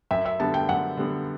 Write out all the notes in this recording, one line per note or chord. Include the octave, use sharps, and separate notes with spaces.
F#2 E5
E5
D3 G3 B3 A5
G5
F#2 F#5
D3 G3 B3